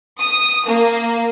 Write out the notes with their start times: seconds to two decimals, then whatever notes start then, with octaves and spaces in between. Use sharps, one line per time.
0.21 D#6
0.66 A#3